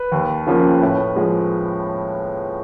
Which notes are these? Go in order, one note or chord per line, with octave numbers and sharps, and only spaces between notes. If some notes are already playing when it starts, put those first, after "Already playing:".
Already playing: B4
D#2
C#3 F3 A#3
A2
F3 G#3